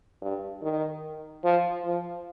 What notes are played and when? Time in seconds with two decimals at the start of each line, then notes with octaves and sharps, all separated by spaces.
0.22 G2
0.62 D#3
1.44 F3
1.85 F3